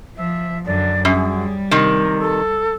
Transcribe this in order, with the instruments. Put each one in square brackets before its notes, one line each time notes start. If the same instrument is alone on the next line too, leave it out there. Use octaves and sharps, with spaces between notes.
[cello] F3 [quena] E5
[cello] F#2 D3 [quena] D5
[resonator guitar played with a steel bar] F#2 [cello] G3 [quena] G#4
[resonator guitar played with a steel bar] C3 D#3 [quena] A#4
[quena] A4